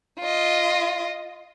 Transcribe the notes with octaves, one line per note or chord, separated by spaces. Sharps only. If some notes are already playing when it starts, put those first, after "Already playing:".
F4 D#5